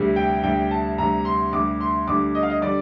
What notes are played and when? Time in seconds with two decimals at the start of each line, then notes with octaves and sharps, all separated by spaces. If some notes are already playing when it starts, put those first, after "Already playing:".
Already playing: D2 C3 G3
0.16 G5
0.43 D2 C3 G3 G5
0.71 A5
0.98 D2 C3 G3 A#5
1.25 C6
1.53 D2 C3 G3 D6
1.81 C6
2.08 D2 D3 G3 D6
2.35 D#5
2.43 F5
2.50 D#5
2.62 D3 G3 D5